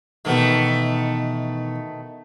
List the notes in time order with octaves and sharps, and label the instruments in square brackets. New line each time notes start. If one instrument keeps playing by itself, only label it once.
[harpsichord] B2 E3 [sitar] D#3 A3 B3